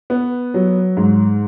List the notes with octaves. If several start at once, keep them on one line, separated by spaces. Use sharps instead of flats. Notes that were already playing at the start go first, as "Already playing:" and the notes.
B3
F#3
G#2